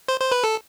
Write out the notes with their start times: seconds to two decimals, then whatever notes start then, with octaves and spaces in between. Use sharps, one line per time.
0.08 C5
0.20 C5
0.32 B4
0.44 A4